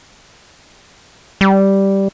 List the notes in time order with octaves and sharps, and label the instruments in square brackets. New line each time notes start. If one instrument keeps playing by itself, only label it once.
[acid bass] G3